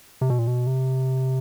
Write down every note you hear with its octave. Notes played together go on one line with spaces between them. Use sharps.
C3
B2
A#2
B2
C3